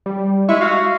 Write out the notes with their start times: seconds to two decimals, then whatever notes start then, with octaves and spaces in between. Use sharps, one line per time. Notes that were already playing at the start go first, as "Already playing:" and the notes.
0.06 G3
0.49 G#3 E4 E5 C#6
0.61 F#4 F5